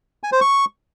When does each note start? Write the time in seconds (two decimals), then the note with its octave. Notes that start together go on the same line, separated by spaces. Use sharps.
0.23 G#5
0.32 C5
0.41 C#6